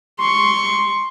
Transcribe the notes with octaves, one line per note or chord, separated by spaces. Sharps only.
C6 C#6